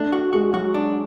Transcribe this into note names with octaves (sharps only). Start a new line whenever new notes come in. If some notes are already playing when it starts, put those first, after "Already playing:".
Already playing: A3 D4
F#4
G#3 F#4
F#3 F#4
D4